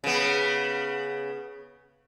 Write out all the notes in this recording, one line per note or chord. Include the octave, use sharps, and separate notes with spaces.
C#3 B3